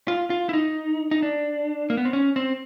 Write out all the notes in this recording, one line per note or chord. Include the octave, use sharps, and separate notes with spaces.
F4
F4
E4
D#4
D#4
D4
A#3
B3
C4
C#4
C4